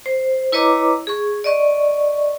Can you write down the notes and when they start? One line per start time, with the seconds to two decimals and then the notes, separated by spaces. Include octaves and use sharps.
0.06 C5
0.52 E4 B4 C#5 D#5 A#5 D6
1.07 G#4 C#6
1.44 D5 D#5 C#6